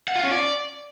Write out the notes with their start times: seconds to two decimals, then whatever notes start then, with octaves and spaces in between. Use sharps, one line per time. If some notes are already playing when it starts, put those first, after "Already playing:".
0.08 F#5
0.16 F4
0.23 C#4
0.31 D5